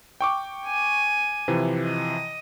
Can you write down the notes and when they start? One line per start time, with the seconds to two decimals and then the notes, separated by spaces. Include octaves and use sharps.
0.21 G5 C#6 D6
0.65 G#5
1.48 C3 E3 F3
1.83 D#5